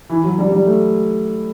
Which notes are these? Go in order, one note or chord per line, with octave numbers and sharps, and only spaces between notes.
E3
F#3
G3
G3
A3